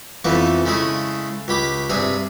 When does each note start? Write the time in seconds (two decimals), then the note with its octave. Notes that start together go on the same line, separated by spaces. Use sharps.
0.24 F2 E3 F3 A3 B3
0.66 C#3 G#3 A3 E4 G#4
1.48 C#2 G4 B5 D6
1.90 G2 C3 G#4 E5